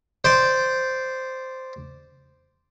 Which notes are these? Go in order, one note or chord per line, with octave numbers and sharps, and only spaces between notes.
C5 D5